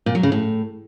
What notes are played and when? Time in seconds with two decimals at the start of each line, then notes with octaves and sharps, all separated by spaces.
0.06 A#2
0.15 F#3
0.23 C#3
0.32 A2